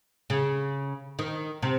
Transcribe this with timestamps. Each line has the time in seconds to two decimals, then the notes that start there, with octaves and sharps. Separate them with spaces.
0.30 C#3
1.19 D#3
1.62 C3